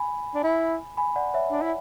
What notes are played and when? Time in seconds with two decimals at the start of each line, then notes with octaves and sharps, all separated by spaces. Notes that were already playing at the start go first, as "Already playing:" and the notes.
Already playing: G#5 B5
0.35 D4
0.43 E4
0.97 G#5 B5
1.16 D5 F#5
1.34 C#5 E5
1.52 D4
1.62 E4